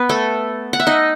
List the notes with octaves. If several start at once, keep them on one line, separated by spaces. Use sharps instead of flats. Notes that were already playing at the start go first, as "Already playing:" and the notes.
Already playing: B3 B4
A3 A4
F#5
E5
D#4 D#5